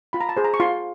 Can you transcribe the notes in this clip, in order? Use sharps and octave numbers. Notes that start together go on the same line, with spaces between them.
F4 B5
A#5
A5
G#4 C5
A#5
C#6
F4 C6